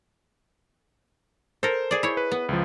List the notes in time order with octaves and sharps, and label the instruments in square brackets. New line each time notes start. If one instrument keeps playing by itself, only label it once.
[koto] A4 A#4 [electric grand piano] C5
[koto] G#4 D5
E4 C#5
[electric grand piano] B4
[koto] B3
[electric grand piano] C#2 F3